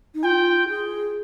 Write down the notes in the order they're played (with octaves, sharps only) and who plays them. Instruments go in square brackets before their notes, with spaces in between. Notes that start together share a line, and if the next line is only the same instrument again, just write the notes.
[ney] D#4
[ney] F4 [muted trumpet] G5
[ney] G#4